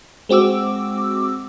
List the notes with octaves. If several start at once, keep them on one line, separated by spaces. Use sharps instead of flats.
G#3 C4 F#4 D6 E6